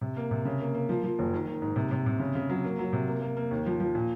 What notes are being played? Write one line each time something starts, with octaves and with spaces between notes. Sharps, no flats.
C3
A#3
C3
C#3
A#3
A#3
F3
F3
F#1
D#3
D#3
G#2
C3
C3
C3
C#3
C#3
F#3
A#3
F#3
C3
A#3
A#3
A#3
D#2
F3
F3
A#2